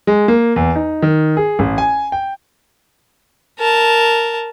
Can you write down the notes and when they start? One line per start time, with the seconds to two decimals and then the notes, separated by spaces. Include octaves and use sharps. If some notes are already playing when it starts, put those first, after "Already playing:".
0.07 G#3
0.28 A#3
0.56 E2
0.75 D#4
1.02 D#3
1.37 G#4
1.59 A1
1.78 G#5
2.12 G5
3.59 A#4 A5